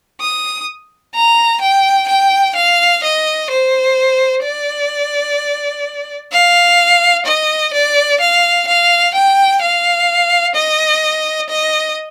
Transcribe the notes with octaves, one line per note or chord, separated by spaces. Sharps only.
D#6
A#5
G5
G5
F5
D#5
C5
D5
F5
D#5
D5
F5
F5
G5
F5
D#5
D#5